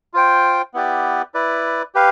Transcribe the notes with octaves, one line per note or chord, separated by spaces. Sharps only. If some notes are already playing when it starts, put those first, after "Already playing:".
F4 C5 G5
B3 E4 G4 B4 D5
E4 B4 D5
G4 B4 F5